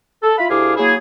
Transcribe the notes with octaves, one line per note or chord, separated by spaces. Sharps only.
A4
E4 F4 F5 B5
D2 E4 G4 G#4 F5 D6
F#3 A#3 E4 G#4